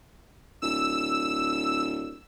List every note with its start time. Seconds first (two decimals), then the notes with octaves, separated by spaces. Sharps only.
0.62 D1 E6